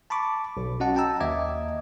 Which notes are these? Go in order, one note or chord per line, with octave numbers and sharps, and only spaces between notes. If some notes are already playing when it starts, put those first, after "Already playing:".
A5 B5 C#6 D6
B1
C#4 F#4 D#5 F#5 A5
G5 A5 A#5 E6
D#2 D#5 E5 D6 G#6